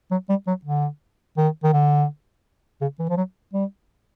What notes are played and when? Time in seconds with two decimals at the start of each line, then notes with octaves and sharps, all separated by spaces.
0.11 F#3
0.29 G3
0.47 F#3
0.65 D3
1.37 D#3
1.63 D#3
1.73 D3
2.81 C#3
2.99 E3
3.09 F3
3.17 F#3
3.53 G3